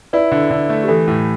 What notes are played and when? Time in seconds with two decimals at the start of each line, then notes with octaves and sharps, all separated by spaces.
0.13 E4 B4 D5
0.32 D3
0.51 D3
0.69 A3
0.83 G4
0.88 E3 A4
1.07 A2